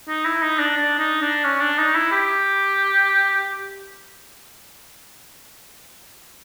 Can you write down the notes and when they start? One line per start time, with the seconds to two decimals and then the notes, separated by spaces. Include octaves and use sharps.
0.08 D#4
0.25 E4
0.42 D#4
0.59 D4
0.77 D4
0.99 D#4
1.22 D4
1.44 C#4
1.61 D4
1.79 D#4
1.95 E4
2.12 G4